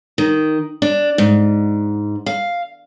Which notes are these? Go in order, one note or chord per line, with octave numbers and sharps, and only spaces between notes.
D#3
D4
G#2
F5